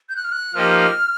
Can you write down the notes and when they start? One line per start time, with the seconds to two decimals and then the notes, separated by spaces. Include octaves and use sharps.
0.09 G6
0.17 F#6
0.24 F6
0.32 F#6
0.54 F3 A#3 D#4 G4 F6